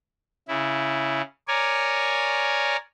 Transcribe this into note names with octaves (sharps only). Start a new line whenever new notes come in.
C#3 E4
A#4 C#5 D5 G#5